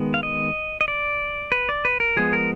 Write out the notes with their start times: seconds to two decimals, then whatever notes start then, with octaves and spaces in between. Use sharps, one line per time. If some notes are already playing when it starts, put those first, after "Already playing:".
Already playing: D#3 G#3 B3
0.14 F5
0.23 D#5
0.81 D#5
0.88 D5
1.52 B4
1.69 D5
1.85 B4
2.00 A#4
2.16 F3 G#3 B3 G#4
2.33 A#4